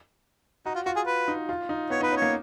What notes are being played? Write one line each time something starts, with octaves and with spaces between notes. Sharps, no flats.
D#4 F#4
F4
F4 F#4
G#4
B4
D#4
F4
D#4
B3 C#5
D#4 B4
C#4
C#5
A#3